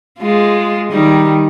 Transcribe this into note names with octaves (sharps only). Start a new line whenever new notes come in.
G#3 F4
D#3 G3 D#4